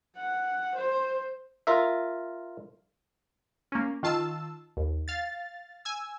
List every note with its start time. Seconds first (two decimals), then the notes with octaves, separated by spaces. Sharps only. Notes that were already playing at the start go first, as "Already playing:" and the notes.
0.17 F#5
0.75 C5
1.67 F4 A#4 E5
3.72 A#3 C#4
4.03 D#3 F4 A5 E6
4.77 D#2
5.08 F5 A6
5.85 G#5 E6